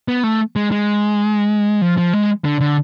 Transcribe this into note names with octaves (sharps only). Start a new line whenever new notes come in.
B3
A3
G#3
G#3
F3
F3
G#3
D3
D3